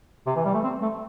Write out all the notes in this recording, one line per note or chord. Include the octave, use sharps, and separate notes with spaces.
C3
E3
G3
A3
C4
A3